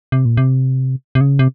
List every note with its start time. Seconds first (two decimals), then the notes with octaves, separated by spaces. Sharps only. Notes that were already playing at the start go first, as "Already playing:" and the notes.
0.12 C3
0.25 A#2
0.37 C3
1.15 C3
1.21 C#3
1.39 C3